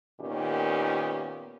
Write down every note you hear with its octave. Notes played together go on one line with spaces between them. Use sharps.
A#2 D#3 B3 C#4 G4